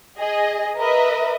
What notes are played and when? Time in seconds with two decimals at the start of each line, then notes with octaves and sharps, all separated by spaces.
0.18 G#4 D#5
0.77 A#4 B4 D#5 E5